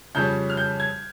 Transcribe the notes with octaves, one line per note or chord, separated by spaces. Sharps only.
F2 C#3 G3 C#4 G6
F6
G6
G#6